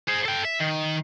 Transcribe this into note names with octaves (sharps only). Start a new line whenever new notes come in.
G#4 C5
A4 G5
E5
D#3